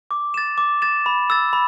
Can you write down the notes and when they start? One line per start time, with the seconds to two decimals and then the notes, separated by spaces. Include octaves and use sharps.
0.11 D6
0.34 A6 E7
0.58 D6
0.82 A6 E7
1.06 B5
1.30 E6 A6
1.53 B5